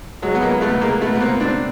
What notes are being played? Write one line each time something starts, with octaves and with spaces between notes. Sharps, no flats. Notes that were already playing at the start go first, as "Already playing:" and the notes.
F#3 G#3
B3
G#3 A#3
A3 B3
G#3 A#3
A3 B3
B3
A#3 C4
C4 D4